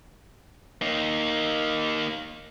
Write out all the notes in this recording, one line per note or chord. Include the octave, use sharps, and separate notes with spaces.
A#3 D#4